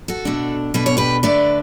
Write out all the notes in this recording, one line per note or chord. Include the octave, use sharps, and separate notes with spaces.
F#4 A4
B2 A3 D4
B2 A3 D4 B4
C#5
G4 B4
D3 A3 D4 B4 D5